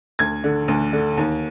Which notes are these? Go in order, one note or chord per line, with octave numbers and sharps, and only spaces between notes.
D2 G#6
D3
D2
D3
D#2